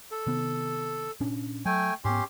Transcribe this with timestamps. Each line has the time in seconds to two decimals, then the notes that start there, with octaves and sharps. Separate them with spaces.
0.11 A4
0.27 C3 D#3 B3
1.20 A#2 C#4 D4
1.66 F#3 A3 G5 G#5
2.05 G#2 B3 C#4 G4 C6